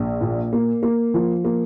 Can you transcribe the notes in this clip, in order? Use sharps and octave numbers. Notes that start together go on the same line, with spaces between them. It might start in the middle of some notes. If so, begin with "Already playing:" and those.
Already playing: A#1
A#2
A#3
A#3
F3
A#3